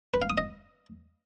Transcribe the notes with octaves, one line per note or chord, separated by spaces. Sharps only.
B4
F5
D#6
D#5